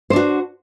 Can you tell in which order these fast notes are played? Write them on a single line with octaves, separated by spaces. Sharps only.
C5 D4 F#4